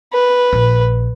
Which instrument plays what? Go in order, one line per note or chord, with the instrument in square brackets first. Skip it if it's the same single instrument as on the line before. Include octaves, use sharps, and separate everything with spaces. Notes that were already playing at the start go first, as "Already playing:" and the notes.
[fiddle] B4
[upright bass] A#1